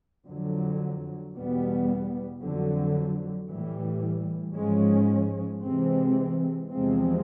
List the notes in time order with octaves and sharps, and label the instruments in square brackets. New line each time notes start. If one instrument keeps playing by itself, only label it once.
[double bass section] F2 D3 F#3
E2 B2 G3 B3
F2 D3 F#3
A2 E3 G3
G#2 F3 G#3 C#4
C3 E3 G#3 C4
E2 C3 F3 G#3 C4